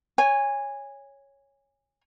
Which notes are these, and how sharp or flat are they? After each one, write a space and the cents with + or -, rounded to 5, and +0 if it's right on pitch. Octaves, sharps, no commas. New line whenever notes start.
C#5 +0 G#5 -20